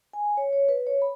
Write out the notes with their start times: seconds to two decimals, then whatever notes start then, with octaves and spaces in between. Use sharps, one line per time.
0.13 G#5
0.37 C#5
0.53 C#5
0.69 B4
0.87 C#5
1.02 B5